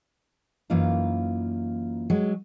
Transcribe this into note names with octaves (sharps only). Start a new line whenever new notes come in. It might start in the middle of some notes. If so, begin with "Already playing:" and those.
F#2 E3 A#3 D#4 F4 F5
F#3 G#3